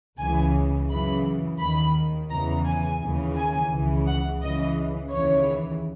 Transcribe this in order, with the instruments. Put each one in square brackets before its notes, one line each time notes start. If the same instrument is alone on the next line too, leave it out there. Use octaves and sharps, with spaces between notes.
[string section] C#2 C#3 E3 G#5
F#2 C#3 E3 B5
D#2 D#3 B5
E2 C#3 E3 A#5
G#5
D#2 C#3 E3
G#5
C#2 C#3 E3
F#5
C#2 C#3 E3 D#5
D#2 C#3 E3 C#5